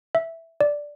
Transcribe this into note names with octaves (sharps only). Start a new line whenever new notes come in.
E5
D5